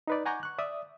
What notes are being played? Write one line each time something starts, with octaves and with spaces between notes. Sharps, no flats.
D#4 B4 D5
F#5 G#5 A#5 C#6 D6 G6
C#6 F#6
D5 E5 D#6